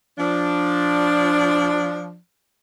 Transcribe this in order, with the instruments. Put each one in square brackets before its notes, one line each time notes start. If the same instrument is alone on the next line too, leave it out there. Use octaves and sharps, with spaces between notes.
[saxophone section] F3 D4